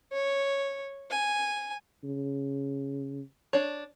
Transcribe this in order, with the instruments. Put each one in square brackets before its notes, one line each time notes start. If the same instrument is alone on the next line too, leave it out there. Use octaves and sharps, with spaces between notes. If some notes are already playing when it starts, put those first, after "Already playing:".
[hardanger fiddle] C#5
G#5
[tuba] C#3
[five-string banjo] D4 C#5